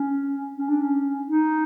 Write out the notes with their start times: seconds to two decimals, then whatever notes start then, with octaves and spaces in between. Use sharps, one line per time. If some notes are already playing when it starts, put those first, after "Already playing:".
Already playing: C#4
0.58 C#4
0.69 D4
0.81 C#4
1.27 D#4